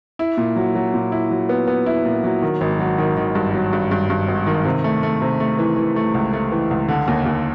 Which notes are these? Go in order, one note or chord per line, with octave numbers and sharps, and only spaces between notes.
E4
A#2
F#3
F#3
A#2
E4
F#3
B3
B3
E4
A#2
F#3
D#3
G#1
F#3
D#3
D#3
G2
F#3
G2
G2
G2
G#1
D#3
C3
A3
A3
C3
A3
E3
E3
A3
C#2
A3
E3
C#2
D3
D#2
D#2